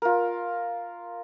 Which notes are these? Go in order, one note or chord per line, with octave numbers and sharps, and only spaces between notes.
F4 A#4